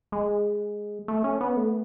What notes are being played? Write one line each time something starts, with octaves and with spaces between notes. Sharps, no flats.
G#3
A3
C#4
B3
A3